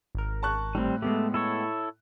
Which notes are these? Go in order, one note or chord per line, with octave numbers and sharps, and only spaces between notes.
G#1 A#4
A5 C#6 F#6
A2 G3 C4
G#3 A3 B3 G4
E4 A4 C#5